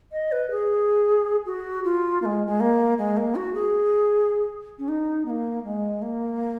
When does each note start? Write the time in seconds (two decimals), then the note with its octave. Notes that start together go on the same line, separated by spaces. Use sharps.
0.12 D#5
0.32 B4
0.51 G#4
1.46 F#4
1.84 F4
2.22 A#3
2.25 G#3
2.47 G#3
2.60 A#3
2.98 G#3
3.17 A#3
3.35 F#4
3.54 G#4
4.79 C#4
4.88 D#4
5.26 B3
5.30 A#3
5.64 G#3
6.02 A#3